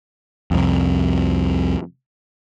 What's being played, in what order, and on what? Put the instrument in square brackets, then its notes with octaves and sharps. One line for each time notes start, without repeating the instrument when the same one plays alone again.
[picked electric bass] C2 F2